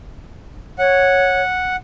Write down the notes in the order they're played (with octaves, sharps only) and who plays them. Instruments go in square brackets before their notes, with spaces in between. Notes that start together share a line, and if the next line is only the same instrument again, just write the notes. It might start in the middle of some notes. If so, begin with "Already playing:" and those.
[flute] C#5 [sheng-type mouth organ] F#5